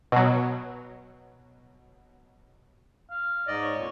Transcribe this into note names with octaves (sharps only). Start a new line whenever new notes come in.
B2 F#3
F5
G#2 D5 D#5
C#5
F2 A#2